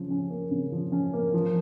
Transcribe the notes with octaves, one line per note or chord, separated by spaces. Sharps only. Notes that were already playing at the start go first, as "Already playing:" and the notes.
Already playing: C#3 F3
C#4
A#3
C#3
F3
C#4
A#3
F3